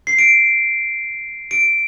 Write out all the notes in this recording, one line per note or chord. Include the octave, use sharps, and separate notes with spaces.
C7
D7
D7